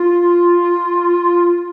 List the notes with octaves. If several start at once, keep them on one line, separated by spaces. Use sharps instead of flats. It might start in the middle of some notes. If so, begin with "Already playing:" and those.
Already playing: F4